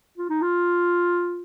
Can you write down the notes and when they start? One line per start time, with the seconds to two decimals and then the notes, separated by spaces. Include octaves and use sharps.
0.18 F4
0.30 D#4
0.42 F4